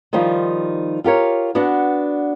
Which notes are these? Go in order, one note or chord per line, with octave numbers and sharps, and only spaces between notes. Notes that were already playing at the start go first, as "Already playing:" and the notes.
D#3 F3 G3 D#4 F4
F4 G4 A#4 C#5
B3 D4 F#4 D5 F#5